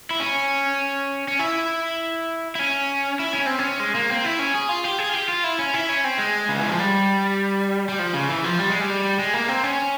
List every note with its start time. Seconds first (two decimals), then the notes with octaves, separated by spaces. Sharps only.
0.11 E4
0.20 C#4
1.28 C#4
1.39 E4
2.55 E4
2.59 C#4
3.20 E4
3.33 C#4
3.46 C4
3.59 C#4
3.80 G#3
3.95 A#3
4.10 C4
4.24 E4
4.39 C#4
4.55 G#4
4.69 F4
4.84 G4
4.98 G#4
5.09 F4
5.13 G4
5.29 F4
5.44 E4
5.59 C#4
5.74 E4
5.89 C#4
6.04 C4
6.18 G#3
6.48 C#3
6.59 E3
6.69 F3
6.79 G3
7.89 G3
7.99 F3
8.14 C#3
8.28 E3
8.44 F3
8.59 G3
8.69 G#3
8.81 G3
9.19 G#3
9.34 A#3
9.48 C4
9.63 C#4